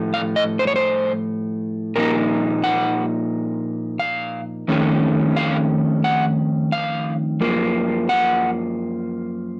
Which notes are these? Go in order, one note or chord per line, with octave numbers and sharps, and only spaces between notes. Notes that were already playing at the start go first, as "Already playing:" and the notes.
Already playing: A2 F3 A3
F5
D#5
C5
C#5
C5
A#2 F3 A#3 D#4 A#4
F#5
F5
F2 D#3 A3 C#4
F5
F#5
F5
F#2 F3 A#3
F#5